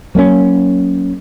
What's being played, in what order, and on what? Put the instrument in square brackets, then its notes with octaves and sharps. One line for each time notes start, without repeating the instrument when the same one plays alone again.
[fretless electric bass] F#3 A#3 B3 C#4